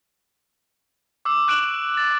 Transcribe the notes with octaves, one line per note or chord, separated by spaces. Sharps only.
D6 E6
C#6 F#6 D7 E7 F#7
A6